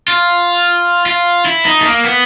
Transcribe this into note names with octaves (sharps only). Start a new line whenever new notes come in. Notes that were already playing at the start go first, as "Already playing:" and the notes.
F4
F4
E4
D#4
A3
A#3
B3